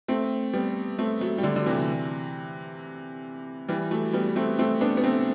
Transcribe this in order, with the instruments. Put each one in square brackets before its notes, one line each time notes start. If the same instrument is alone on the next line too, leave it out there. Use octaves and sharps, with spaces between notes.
[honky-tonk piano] A3 C4
G3 B3
A3 C4
F#3 A3
G3
D3 F#3
D3
C3 E3
E3 G3
F#3 A3
G3 B3
A3 C4
A3 C4
B3 D4
B3
A3 C4